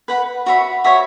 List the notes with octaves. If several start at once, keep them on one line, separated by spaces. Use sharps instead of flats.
B4 F#5 B5
F#4 C#5 E5 B5
F#4 C#5 E5 B5